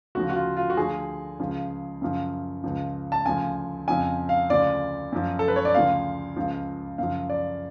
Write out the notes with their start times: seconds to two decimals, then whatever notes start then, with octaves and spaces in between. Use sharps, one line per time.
0.15 D2 C#3 F3 F#4
0.30 F#4
0.36 F4
0.57 F4
0.70 F#4
0.77 D2 D3 F3 G#4
1.39 C#2 C#3 F3
2.01 F#2 C#3 F3
2.64 C#2 C#3 F3
3.12 A5
3.25 D2 C#3 F3 G#5
3.88 F2 C#3 F3 G#5
4.29 F5
4.50 D2 C#3 F3 D5
5.12 F#2 F3
5.39 A4
5.48 B4
5.56 C#5
5.65 D5
5.74 D2 C#3 F3 F5
6.36 C#2 C#3 F3
6.98 F#2 C#3 F3 F5
7.30 D5